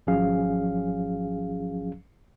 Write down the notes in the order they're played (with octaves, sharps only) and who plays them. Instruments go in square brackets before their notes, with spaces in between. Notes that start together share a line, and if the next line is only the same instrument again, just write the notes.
[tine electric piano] G#1 F3 F#3 C#4 G#4 F5